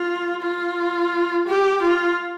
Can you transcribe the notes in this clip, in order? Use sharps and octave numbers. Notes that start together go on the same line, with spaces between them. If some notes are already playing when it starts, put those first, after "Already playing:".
Already playing: F4
F4
G4
F4